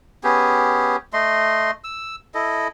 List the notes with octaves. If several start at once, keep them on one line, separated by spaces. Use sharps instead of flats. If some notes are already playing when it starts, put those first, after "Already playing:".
B3 C#4 G4 G#4
A3 D#5 C6
E6
E4 A4 D#5